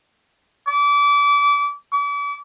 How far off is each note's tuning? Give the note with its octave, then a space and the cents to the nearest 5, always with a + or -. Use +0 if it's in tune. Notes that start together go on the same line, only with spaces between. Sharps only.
D6 -30
D6 -40